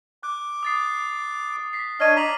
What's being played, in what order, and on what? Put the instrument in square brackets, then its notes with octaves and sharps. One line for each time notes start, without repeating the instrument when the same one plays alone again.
[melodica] D6 [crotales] F#6
[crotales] D#6 A6 C7
B6 C7
[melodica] D4 C#5 D#5 [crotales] F6 D#7
[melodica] A#5 [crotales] D6 B6 F#7